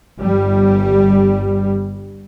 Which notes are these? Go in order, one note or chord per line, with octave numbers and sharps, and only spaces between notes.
G1 G3